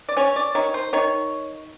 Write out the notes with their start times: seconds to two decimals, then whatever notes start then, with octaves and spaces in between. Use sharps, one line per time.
0.09 D5
0.17 C#4 C#5
0.36 D5
0.55 D#3 C#5
0.74 C5
0.93 D#3 C#5